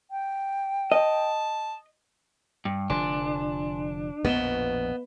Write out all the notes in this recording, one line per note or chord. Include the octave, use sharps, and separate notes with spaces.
G5
D#5 A5
G2
F1 D3 F3 D4 G#5 C6
A#1 F2 B2 B3 D#5 E7 G7